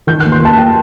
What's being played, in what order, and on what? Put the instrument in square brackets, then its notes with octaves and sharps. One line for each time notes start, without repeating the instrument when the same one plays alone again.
[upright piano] D#3 G6
F#6
D#2
C6
D#2 A5
D#2 G5